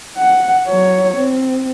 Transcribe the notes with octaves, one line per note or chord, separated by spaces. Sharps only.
F#5
F#3 C#5
C4